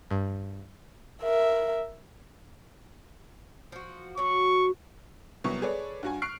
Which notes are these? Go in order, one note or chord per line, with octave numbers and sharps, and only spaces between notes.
G2
A#4 E5
F3 F#4
F#3 F#4 C#6
C2 F#3 B3 C#6
G#4 A4 B4 C#5 D5
G2 F#4 G#5
C#6 F6 F#6 C7 D7